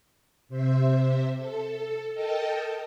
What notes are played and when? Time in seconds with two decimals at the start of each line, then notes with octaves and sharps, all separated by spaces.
0.49 C3 C5 E5
1.37 A4
2.14 A4 A#4 D#5 G5 A5